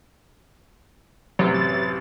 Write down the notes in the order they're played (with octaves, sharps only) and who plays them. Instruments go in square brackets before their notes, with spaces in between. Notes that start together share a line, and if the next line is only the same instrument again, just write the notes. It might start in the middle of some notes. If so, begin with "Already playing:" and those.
[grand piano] A1 F#2 C3 [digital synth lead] F#3
[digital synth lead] A6